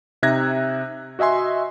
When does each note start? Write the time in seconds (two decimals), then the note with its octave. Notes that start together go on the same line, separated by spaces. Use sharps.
0.23 C3 D#4 E5 F#6 G#6 A#6
1.19 F#4 D#5 E5 G#5 C6